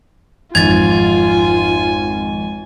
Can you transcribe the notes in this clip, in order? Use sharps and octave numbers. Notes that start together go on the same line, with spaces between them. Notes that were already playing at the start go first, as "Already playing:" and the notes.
G#1 F2 F4 G#5 G#6 A6 F7